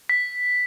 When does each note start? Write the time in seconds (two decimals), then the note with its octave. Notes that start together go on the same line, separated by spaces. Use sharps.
0.09 B6